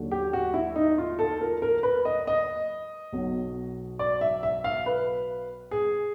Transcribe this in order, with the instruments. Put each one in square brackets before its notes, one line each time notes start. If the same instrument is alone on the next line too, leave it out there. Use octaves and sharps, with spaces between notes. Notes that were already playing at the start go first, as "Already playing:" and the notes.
Already playing: [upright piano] D#2 D3 F#3
G4
F#4
E4
D#4
F4
A4
A#4
A#4
B4
D#5
D#5
B1 B2 F#3
D5
E5
E5
F5
B4
G#4